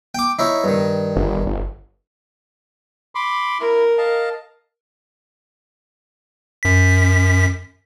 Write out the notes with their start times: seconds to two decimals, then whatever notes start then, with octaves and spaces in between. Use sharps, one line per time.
0.15 G5 D6
0.39 D#4 E4 C#5
0.64 G2 D#3
1.16 G1
1.46 G1
3.15 B5 C6 D6
3.60 E4 A#4
3.98 D#5 F5 A5
6.63 F#2 B6